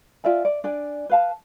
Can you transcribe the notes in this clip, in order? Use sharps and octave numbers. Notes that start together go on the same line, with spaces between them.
F4 D5 E5 G#5
D5
D4 D5 G#5
B4 F5 A5